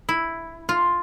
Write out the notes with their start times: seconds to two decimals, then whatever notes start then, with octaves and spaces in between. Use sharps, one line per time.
0.09 E4
0.69 F4